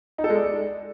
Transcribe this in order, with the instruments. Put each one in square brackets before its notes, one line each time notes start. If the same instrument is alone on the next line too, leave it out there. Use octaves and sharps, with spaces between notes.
[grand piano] D#4
A4
G#3
D5